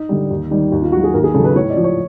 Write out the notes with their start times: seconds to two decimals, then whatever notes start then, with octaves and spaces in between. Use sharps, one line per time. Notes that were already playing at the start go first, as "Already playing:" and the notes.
Already playing: D#4
0.09 D3 G3
0.30 D#2
0.51 D#3 G3
0.72 D#2
0.82 F4
0.92 D#3 F#3 F#4
1.04 G#4
1.14 D#2 A#4
1.24 G#4
1.34 C#3 A4
1.39 F#3
1.45 B4
1.55 A2 C#5
1.70 D5
1.76 F3
1.84 C#5